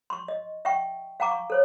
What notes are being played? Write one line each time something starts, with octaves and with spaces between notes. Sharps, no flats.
C6 C#6
D#5
E5 F#5 G5 C#6
F5 F#5 G#5 A#5 D6
C#6
A4 C5 C#5